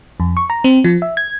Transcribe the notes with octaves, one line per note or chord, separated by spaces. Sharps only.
F2
C#6
A#5
C4
F3
E5
G#6